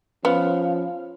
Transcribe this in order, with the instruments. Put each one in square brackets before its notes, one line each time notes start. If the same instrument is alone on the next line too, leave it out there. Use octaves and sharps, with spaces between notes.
[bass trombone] F3 [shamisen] B3 [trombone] C#4 [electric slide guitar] F5